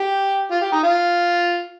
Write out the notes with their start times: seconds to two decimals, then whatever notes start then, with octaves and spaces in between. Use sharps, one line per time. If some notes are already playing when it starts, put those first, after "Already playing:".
Already playing: G4
0.51 F4
0.62 G4
0.72 D#4
0.83 F4